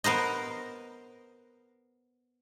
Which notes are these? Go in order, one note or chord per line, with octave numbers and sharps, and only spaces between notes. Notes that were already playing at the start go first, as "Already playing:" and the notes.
B3 A#4 C5 D#5